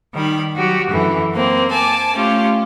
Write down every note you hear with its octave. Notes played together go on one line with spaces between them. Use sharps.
D#3 G3 B5
F#3 F#4 G4
F#2 D3 E3
A#3 C4
G#5 A5 D6
A3 C#4 F4 G4